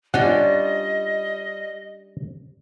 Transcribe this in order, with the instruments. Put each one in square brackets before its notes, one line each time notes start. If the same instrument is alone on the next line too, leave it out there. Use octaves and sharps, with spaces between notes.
[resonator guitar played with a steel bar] G3 [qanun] C#4 D4 F4 [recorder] D#5 [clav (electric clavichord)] F#5